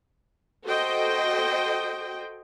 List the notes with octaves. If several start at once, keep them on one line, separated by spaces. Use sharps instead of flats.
F#4 A4 C5 D#5 G5